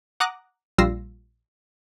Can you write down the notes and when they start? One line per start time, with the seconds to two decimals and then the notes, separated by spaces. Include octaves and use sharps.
0.20 F#5 A#5 D6 D#6 F#6 A#6
0.78 A#1 G3 F4 E6 A#6 C7